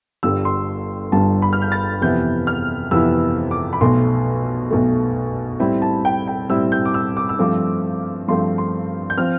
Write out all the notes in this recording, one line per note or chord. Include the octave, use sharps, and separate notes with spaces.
G1 G2 D3 G3 E6
C6
G1 G2 D3 G3 A5
B5
F6
G6
A6
F2 C3 E3 B3 E4 G6
F6
F2 C3 E3 B3 E4 E6
D6
B5
B1 B2 A3 C6
B1 B2 A3
A2 G3 C4 E4 B5
A5
G5
G5
A2 G3 C4 E4 E6
G6
D6
E6
D6
E6
G2 F3 A3 C4 D6
G2 F3 A3 C4 C6
C6
G6
F3 C4 F6